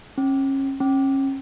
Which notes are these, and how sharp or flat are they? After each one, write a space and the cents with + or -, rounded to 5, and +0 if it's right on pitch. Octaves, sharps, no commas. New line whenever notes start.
C#4 -30
C#4 -30